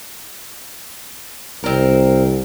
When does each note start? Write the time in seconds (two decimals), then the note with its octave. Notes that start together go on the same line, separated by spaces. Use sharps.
1.64 C2 C4 A#4